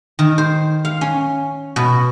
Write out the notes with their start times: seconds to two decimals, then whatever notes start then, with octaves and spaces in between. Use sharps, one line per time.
0.19 D#3
0.38 C5
0.85 F5
1.01 C#4
1.76 B2